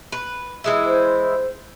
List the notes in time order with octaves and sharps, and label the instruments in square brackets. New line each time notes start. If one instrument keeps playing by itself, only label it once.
[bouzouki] B4
E3 G#3 E4
[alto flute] C5